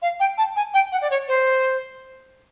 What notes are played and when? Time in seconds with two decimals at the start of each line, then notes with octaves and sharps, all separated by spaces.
0.02 F5
0.20 G5
0.38 A5
0.56 G#5
0.74 G5
0.92 F#5
1.02 D5
1.10 C#5
1.28 C5